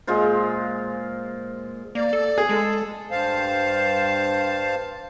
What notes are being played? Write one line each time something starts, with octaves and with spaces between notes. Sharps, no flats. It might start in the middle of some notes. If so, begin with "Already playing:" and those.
A#2 G#3 F4 C5
A#3 D5
A4
G#4
G#3 A4
G2 C5 F5 A5